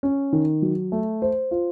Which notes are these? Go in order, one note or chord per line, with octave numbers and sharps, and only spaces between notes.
C#4
D#3
F#3
A3
C5
F4